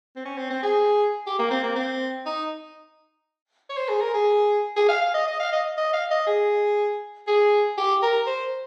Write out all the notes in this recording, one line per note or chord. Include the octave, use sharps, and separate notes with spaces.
C4
C#4
C4
C4
G#4
G4
A#3
C4
A#3
C4
D#4
C#5
C5
G#4
A#4
G#4
G#4
F5
F5
D#5
D#5
F5
D#5
D#5
F5
D#5
G#4
G#4
G4
A#4
C5